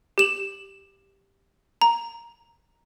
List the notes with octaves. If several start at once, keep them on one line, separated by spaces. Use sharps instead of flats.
G4 E7 F#7
A#5